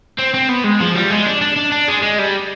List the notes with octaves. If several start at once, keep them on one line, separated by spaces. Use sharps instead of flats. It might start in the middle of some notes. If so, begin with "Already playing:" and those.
C4
C4
B3
G#3
F3
G3
G#3
D4
D4
D4
D4
G#3
G#3
G3